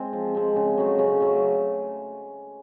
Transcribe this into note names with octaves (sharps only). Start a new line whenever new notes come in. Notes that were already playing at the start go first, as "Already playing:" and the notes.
Already playing: G#3 C4
F3
G#3 C4
C#3
F#3 A3
C#3
F#3 A3